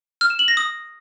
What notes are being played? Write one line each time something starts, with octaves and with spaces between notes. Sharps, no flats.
F6
E7
F#7
A#6
D#6